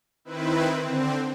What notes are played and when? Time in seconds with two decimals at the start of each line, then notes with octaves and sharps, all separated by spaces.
0.25 D#3 C4 E4 B4
0.81 D3 C4